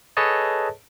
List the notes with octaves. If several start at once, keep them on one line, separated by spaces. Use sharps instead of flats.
G#4 A4 B4 C#5 D#5 A5